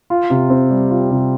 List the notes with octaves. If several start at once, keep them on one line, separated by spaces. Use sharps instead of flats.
F4
C3
C4
G3
F4
C3